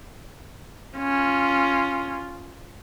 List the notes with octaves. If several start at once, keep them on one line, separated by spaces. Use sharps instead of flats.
C#4 F4